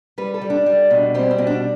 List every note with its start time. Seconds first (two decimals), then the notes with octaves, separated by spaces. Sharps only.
0.18 G3 B4
0.34 A4
0.42 G3
0.50 D4
0.66 G3
0.90 B2
1.14 G3 C4
1.31 C4
1.38 B2
1.47 D4